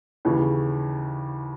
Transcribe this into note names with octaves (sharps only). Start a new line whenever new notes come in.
D#2 C#3 E3